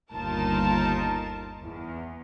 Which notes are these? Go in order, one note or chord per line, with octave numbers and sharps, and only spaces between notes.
G1 D#2 D#4 F4 A#4 A5
E2